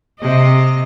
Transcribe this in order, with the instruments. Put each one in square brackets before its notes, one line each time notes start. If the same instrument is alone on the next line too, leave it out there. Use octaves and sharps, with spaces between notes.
[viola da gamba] C3 D#5